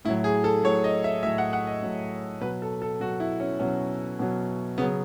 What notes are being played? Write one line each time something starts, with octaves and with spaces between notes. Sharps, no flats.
A2 F#3 E4
G#4
A4
A2 F#3 C#5
D#5
E5
A2 F#3 E5
F#5
F#5
D#5
A2 F#3
B2 F#3 B4
A4
A4
B2 F#3 F#4
E4
C#4
B2 F#3 C#4
B2 F#3
C#3 F#3 B3